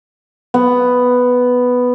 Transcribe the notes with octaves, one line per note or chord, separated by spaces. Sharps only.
B3